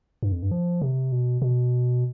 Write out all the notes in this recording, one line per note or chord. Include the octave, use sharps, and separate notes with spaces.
G2
F2
G2
F3
C3
B2
B2